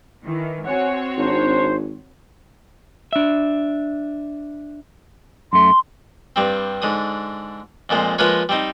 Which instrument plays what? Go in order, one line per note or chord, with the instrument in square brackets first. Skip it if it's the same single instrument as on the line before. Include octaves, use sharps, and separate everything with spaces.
[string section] D#3 E3
[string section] C4 F#4 C#5 [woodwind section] F#5 G#5
[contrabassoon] G#1 [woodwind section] D4 D#4 C5
[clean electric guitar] D4 E5
[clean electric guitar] F#2 A3 [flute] C6
[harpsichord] G2 G3 C4
G#2 D3 D#6
F2 A#2 F3 G#3
F3 G#3 A#3 F4 B4 C#5
G3 C4 D#4